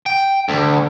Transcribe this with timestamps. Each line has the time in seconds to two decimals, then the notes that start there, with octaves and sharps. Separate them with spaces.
0.06 G5
0.49 D2